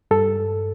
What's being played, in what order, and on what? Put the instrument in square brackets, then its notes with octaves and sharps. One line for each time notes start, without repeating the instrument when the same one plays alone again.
[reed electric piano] G2 A4